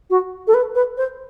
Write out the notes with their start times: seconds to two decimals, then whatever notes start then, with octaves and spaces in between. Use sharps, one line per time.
0.10 F#4
0.47 A4
0.54 B4
0.75 B4
0.97 C5